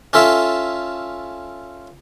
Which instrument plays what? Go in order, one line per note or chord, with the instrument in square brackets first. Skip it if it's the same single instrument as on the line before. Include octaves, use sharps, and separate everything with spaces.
[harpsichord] C#4 F4 A4 E5